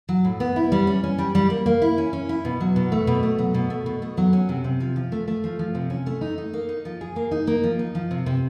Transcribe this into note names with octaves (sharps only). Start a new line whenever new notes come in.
F#3
A2
B3
E4
G3
C#4
C#4
G3
G3
A#3
A#3
E4
C#4
C#4
E4
B2
F#3
B2
A3
B2
A3
F#3
B2
A3
B2
A3
F#3
C#4
C3
C3
F3
F3
A3
A3
F3
F3
C3
C#4
A3
D#4
D#4
A#3
D#4
F3
G#4
A#3
D#4
A#3
F3
D#4
F3
C3
C3